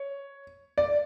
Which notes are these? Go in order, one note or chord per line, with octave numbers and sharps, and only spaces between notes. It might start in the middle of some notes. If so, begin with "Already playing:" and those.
Already playing: C#5
D5